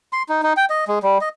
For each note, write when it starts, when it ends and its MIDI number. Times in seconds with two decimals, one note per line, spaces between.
0.13 0.23 84
0.29 0.42 63
0.43 0.53 63
0.57 0.65 79
0.70 0.84 75
0.88 0.99 56
1.03 1.18 55
1.21 1.29 75